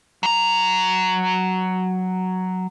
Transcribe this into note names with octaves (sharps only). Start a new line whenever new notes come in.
F#3 A#5